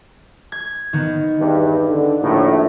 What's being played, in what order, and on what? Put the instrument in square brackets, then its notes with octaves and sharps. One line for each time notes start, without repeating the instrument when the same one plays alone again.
[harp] G#6
D#3 B3
[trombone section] E2 G2
D3
A#1 A2